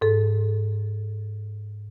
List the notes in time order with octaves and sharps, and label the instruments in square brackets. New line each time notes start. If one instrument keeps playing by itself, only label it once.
[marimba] G#2 A4